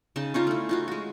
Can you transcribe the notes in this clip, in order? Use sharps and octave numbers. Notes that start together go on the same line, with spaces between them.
C#3 D#4 A5
C#4 D#4 F4 C#5
A3 E4
D#4 F4 F#4
G#3 F#4